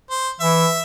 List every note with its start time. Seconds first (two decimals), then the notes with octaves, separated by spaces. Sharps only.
0.10 C5
0.40 E3 E5